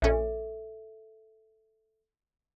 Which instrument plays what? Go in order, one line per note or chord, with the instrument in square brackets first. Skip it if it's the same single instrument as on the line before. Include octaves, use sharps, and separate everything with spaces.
[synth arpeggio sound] A#1 C#4 [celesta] A4 E5